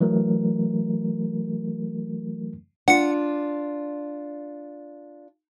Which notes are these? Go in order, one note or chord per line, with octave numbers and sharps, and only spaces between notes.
E3 F#3 A3 A#4
D4 F4 F#5 C#7